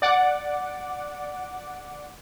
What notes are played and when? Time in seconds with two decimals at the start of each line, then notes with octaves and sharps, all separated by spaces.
0.02 D5 F#5 D6